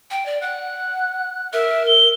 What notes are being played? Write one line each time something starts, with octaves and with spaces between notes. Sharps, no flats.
G5
D5
F#5 F#6
A#4 E5
G7